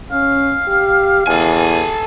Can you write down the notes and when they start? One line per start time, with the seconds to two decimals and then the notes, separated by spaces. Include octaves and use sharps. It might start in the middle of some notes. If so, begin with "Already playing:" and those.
0.12 C#4 F5
0.68 G4
1.27 E2 A4 G#5